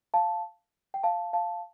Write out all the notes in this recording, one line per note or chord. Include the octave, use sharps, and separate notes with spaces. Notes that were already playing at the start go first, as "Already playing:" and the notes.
F5 A5
G5
F5 A5
F5 A5